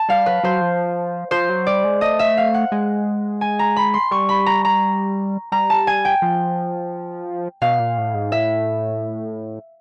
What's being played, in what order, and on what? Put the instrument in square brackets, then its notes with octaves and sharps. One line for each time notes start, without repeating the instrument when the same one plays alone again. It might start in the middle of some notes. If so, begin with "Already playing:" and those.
Already playing: [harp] A5
[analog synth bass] G3 [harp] F5
[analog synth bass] F#3 [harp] B4
[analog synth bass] F#3 [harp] C5
[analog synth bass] F3
[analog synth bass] F3 [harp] C5
[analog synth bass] F#3
[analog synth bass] G3 [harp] D5
[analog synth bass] G#3
[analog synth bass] A3 [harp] D#5
[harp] E5
F5
F#5
[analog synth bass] G#3
[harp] G#5
A#5
B5
C6
[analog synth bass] G3 [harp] C#6
[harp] B5
A#5
A#5
[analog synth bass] G3 [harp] A#5
[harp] A5
G#5
G5
[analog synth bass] F3
[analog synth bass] B2 [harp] F5
[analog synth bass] A#2
A2
G#2
[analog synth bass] A2 [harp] E5